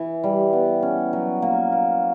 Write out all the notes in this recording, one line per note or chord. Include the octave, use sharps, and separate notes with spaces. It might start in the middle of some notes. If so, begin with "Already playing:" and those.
Already playing: E3
G3
B3
C#4
F#3
A#3
A#3